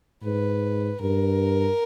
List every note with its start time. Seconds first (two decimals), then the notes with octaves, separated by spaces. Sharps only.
0.24 G#2 B4
1.01 G2 A#4